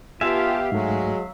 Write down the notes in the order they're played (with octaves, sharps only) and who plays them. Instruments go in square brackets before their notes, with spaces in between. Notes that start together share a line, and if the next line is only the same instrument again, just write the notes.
[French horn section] B3 G4 [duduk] F4 [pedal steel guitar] E5 F5 [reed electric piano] G#5 A5
[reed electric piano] G#2 A3 [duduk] F#3 [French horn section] G#3 F#4